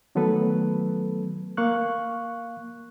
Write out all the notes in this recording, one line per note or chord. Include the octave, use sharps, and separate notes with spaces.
D#3 F#3 A3 B3 A4 B4
A#3 F5 C#6 F#6